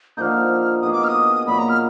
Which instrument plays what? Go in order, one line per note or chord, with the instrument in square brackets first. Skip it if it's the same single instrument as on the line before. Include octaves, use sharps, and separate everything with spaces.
[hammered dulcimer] D3 F3 A#3 D#4 [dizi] F6 G6
[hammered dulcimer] B2 A#3 D#4 G#4 [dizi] D#6
[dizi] D6
F6
D#6
[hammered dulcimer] A#2 F#3 A#3 [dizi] B5
[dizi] A#5
F6